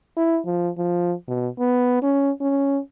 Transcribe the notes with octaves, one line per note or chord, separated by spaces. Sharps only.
E4
F3
F3
B2
B3
C#4
C#4